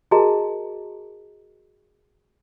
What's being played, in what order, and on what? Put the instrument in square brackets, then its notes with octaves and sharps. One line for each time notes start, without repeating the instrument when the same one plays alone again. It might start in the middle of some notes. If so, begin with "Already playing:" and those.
[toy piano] F#4 G#4 A#4 D#5 A5 A#5